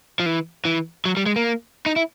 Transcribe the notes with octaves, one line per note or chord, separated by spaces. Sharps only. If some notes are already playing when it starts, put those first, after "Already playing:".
F3
E3
E3
F#3
G3
G#3
A#3
D#4
E4